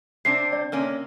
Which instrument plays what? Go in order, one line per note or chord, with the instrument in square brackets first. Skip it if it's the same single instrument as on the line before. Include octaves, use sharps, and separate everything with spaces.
[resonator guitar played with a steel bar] C3 C4 D4 [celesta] C7
[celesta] D5
[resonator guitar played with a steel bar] C3 A#3 C#4